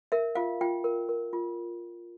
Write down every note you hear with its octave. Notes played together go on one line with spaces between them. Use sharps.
A#4 E5
F4 F5
F4 G5
A#4
A#4
F4